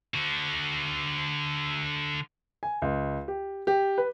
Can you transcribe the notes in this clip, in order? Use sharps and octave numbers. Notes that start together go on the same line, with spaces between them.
D3 F#4
G#5
C#2
G4
G4
B4